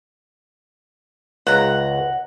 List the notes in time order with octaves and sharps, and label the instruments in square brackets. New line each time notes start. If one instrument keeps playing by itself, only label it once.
[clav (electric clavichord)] C#2 [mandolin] F#5 A#5